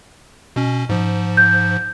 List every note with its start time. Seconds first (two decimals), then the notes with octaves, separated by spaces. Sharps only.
0.56 B2 C#4
0.89 G#2 F3
1.37 G6